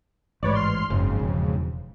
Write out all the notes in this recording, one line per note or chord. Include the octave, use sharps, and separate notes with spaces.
A1 G#2 B4 C#5 D5
C6 F6 C7
F#1 F2 G#2 C#3
E1